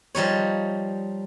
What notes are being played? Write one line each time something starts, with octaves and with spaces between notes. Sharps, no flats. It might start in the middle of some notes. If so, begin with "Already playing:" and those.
F3 G3 D#4 C#5